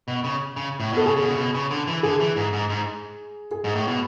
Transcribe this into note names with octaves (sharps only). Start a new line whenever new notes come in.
B2
C#3
C#3
A2
B2 A4
C#3 G#4
C#3
B2
C#3
B2
C#3
D3
E3
D3 G#4
E3
G#2
G#2
G#2
G#4
G#2
A2
B2